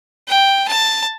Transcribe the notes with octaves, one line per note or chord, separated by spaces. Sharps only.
G5
A5